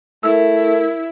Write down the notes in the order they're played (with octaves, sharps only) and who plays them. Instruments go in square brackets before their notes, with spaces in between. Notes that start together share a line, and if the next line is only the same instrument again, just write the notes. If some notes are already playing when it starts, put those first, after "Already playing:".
[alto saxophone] A3 [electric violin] E4 [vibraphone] A#4 [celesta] E6